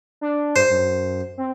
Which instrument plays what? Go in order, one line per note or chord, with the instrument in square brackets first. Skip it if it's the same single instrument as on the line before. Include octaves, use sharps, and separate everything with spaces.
[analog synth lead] D4
[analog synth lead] G2 [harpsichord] C5
[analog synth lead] F#2
C4